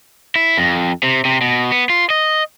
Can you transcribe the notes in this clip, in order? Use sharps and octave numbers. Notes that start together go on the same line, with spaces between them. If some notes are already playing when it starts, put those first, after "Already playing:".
E4
F2
C3
C3
B2
B3
F4
D#5